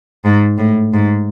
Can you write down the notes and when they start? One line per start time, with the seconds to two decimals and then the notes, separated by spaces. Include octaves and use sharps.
0.25 G#2
0.58 A2
0.94 G#2